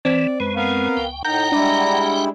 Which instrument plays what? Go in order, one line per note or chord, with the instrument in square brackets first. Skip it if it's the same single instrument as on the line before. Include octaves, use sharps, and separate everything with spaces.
[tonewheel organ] E3 [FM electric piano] C4 [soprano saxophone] D5
[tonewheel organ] F#2 G#3 [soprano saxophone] B4
[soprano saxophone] B3 [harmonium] A#4 F5
[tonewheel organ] C#2 G5
[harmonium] A2 D#4 [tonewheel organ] F#5 G5 [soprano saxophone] A#5 [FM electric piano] G6
[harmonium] G3 G#3 E4 [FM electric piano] D4 D5